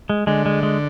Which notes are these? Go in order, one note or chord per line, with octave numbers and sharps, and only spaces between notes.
G#3
D3 G#3
G#3
G#3